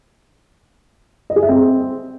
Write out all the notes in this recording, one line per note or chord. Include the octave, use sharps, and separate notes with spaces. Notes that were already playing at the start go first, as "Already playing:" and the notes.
D#5
G#4
E5
C4